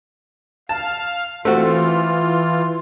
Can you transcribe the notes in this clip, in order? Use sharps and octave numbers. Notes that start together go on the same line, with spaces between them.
F5 A5
E3 A3 C4 F4 F#4